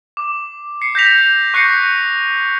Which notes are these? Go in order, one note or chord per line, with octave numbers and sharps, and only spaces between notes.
D6
C7 C#7
G6 A#6 B6 F7
C#6 F#6 G6 A#6 C7 C#7